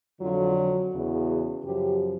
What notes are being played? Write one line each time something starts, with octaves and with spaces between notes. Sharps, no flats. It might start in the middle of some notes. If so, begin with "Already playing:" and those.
F2 D3 F#3 F4
F#4
E2 C#3 E3
F#2 C#3 F3 G4